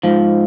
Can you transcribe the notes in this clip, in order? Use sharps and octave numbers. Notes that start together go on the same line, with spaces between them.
G#2 F3